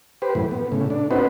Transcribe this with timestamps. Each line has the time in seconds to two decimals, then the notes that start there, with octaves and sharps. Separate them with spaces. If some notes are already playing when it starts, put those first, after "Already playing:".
0.22 G4 B4 C5
0.35 F#2 A2 E3
0.51 B3
0.72 A2 C#3
0.90 D4
1.11 B3 C#4 D#4 F#4 B4 C5